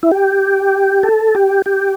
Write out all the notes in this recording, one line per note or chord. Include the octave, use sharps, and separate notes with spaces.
E4
G4
A4
G4
G4